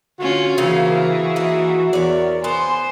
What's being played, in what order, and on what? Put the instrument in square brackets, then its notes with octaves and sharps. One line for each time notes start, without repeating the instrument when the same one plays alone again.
[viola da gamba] D3 C#4 F4 [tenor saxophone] F#4
[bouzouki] C#3 C4 F5 [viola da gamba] E3 G#4 [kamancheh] A#3
[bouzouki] A#3 D#4 [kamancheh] E5
[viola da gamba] E2 [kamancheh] A#4 [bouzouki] C#5 D5
[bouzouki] B3 [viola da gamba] C5 [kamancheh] G#5 C6